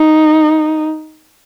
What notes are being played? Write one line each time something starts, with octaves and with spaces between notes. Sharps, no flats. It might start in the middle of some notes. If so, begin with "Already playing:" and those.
Already playing: D#4